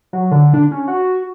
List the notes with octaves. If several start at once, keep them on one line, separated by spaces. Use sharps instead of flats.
F#3
D3
D4
C#4
F#4